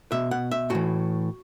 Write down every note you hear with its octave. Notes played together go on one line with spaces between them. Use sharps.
B2 E5
F#5
E5
A2 E3 F#4